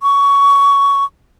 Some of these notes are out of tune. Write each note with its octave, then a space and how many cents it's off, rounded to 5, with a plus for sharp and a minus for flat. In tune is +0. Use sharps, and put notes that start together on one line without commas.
C#6 +15